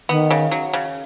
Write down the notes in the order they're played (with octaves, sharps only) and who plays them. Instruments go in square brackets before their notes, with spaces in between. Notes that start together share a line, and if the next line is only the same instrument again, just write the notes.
[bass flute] D#3 [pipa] B3
[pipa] C#3
F#3
C#3